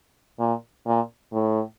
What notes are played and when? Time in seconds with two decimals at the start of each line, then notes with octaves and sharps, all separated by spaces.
0.39 A#2
0.86 A#2
1.33 A2